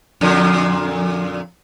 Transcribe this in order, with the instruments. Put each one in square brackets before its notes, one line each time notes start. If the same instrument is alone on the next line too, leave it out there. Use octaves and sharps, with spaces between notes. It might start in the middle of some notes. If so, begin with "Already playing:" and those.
[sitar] F2 A#2 D3